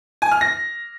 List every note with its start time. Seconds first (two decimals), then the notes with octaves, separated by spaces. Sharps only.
0.22 G#5
0.31 F6
0.41 A#6